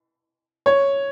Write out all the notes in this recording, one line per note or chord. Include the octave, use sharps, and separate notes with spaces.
C#5